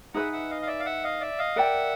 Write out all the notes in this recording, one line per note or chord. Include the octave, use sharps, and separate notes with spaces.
D#4 G#4 B4 E5 F#5
E5 F#5
D#5 F5
F5
D5 E5
F5
E5 F#5
D#5 F5
D5 E5
D#5 F5
A#4 D5 E5 F#5 G5